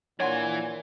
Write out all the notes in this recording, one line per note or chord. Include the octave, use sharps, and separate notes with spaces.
A#2 E3 D4 C#5 F#5 G#5 C6